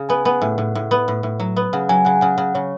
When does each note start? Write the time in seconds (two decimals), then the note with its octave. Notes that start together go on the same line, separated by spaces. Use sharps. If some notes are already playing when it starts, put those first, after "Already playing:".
Already playing: C#3
0.09 B3 G#5
0.25 B3 F#5
0.42 A2
0.58 A2
0.75 A2
0.91 B3
1.08 A2
1.23 A2
1.40 F#3
1.56 B3
1.73 C#3 F#5
1.89 F#3 G#5
2.05 C#3 F#5
2.21 C#3 F#5
2.38 C#3
2.55 C#3 C#5